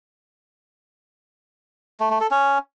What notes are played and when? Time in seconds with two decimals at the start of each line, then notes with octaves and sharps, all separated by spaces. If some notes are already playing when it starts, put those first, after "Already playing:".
2.00 A3
2.10 A3
2.21 A4
2.31 C#4